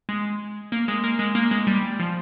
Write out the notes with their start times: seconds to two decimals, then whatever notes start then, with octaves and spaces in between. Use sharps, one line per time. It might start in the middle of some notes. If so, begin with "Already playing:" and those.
0.09 G#3
0.72 A#3
0.88 G#3
1.04 A#3
1.19 G#3
1.35 A#3
1.51 G#3
1.67 G3
2.00 F3